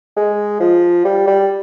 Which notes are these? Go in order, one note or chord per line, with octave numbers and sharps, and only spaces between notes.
G#3
F3
G3
G3